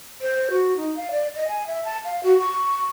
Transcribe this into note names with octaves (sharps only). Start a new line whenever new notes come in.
C5
F#4
D#4
F5
D5
D#5
G#5
E5
A5
F5
F#4
C#6